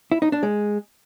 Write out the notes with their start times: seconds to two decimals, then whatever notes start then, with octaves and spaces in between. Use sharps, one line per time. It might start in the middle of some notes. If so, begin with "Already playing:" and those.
0.12 E4
0.22 D#4
0.32 D4
0.43 G#3